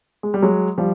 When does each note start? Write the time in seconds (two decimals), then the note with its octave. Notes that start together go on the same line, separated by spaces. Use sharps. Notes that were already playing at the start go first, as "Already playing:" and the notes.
0.23 G#3
0.34 G3
0.42 F#3 G#3
0.78 F3 G3